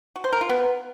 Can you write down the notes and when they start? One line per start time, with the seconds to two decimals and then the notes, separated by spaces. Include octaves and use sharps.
0.16 F#4
0.24 C5
0.32 A#4
0.41 F4
0.49 B3